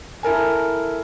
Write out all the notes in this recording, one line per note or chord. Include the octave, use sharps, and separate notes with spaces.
E4 A4 A#4 G#5